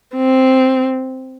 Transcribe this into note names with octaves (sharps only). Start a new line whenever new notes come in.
C4